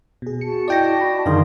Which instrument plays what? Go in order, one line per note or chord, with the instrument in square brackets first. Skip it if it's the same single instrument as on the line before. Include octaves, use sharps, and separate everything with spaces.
[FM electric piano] B2 G#4
[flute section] F#4 A5 [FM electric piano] C#7
[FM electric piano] E4 D#5 [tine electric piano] D5 G5 A#6
[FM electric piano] E4 B5
[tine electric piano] F#2 D3 D#3 [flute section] G#4 D5 C6 [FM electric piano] F5